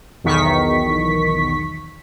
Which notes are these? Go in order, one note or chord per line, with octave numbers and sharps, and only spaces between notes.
B1 E2 D#3 C#6 B6